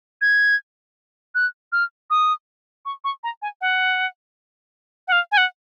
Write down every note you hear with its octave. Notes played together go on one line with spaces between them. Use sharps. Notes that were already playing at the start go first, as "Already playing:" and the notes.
G#6
F#6
F6
D#6
C#6
C#6
A#5
G#5
F#5
F#5
F5
G#5
F#5